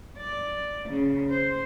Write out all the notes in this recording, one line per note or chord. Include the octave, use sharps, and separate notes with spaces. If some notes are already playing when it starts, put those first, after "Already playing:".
D5
C#3
C5